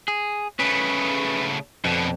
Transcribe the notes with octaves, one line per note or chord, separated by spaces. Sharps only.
G#4
C#3 A3 B4
F2 B2 D3